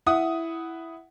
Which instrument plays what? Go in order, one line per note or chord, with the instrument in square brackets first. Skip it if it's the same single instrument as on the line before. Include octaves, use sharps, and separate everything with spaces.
[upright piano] E4 F#5 D#6